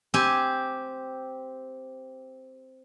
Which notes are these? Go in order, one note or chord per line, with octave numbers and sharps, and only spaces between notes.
C4 G4 G#5